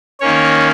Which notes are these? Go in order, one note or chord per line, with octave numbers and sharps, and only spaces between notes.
D#3 A#3 C#4 C#5